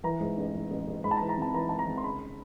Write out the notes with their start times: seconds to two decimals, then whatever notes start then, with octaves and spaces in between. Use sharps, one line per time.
0.04 E3 A#5
0.20 G#2
0.38 A1
0.54 A1
0.71 A1
0.88 A1
1.04 G#2 B5
1.11 A5
1.17 A#5
1.21 E3
1.29 A#5
1.38 G#1 A5
1.54 E3 A#5
1.69 G#1 A5
1.79 A#5
1.87 G#1
1.97 C6
2.04 C#3 B5